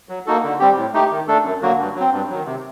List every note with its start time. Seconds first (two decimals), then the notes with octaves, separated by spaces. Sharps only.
0.09 F#3
0.26 A#3 D#4 F#4 A4
0.43 D3
0.59 G3 C4 G4
0.76 A2
0.93 A3 D#4 G4
1.10 D#3
1.27 A3 D4 A4
1.44 F#2
1.61 D3 F#3 A#3 F#4
1.79 G2
1.95 F#3
2.00 C4
2.12 G2
2.30 D#3 F#3
2.46 C3